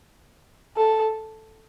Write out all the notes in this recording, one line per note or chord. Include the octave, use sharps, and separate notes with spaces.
A4